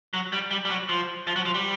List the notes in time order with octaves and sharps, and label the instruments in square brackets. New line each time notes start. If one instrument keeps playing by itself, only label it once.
[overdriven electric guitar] F#3
G3
G3
G3
F#3
F3
F3
F#3
F3
G3